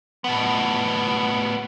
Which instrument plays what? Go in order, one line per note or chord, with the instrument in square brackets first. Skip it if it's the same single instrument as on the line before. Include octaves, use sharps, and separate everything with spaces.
[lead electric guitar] A2 B3